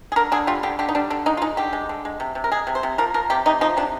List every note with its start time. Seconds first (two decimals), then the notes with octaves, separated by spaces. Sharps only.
0.12 G#4
0.16 D3 A#4
0.32 D3 G#4
0.47 G3 F4
0.63 D3 G4
0.79 D3 G4
0.89 D#4
0.95 G3 D4
1.10 D3
1.26 G#3 D#4
1.37 F4
1.42 G#3 D#4
1.57 D3 G4
1.73 G#3
1.89 D3
2.05 G#3
2.20 C3
2.35 C3
2.44 A#4
2.52 G#3 G#4
2.67 C3
2.75 C5
2.83 C3
2.98 F3 A#4
3.14 F3 A#4
3.30 C3 G4
3.46 C3 D#4
3.61 F3 D#4
3.77 C3 D4